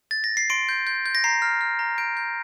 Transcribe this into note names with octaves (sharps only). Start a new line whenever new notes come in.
A6
A#6
C7
C6 D7
G6
G6
G6
A#6
A#5 C7
F6
F6
A#5
G6 D7
G6